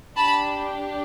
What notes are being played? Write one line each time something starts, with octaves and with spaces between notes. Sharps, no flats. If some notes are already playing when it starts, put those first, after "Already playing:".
D4 G4 A5 B5